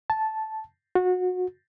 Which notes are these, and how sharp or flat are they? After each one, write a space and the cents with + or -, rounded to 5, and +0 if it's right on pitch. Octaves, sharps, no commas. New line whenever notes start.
A5 -5
F#4 -25